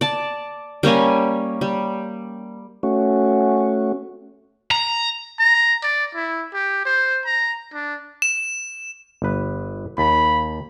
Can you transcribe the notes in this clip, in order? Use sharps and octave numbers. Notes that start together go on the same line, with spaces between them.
D5 A5
G3 A#3 C#4 G#5
G3
A3 C#4 F#4
A#5
A#5
D5
E4
G4
C5
A#5
D4
E7
G1 B4
D#2 B5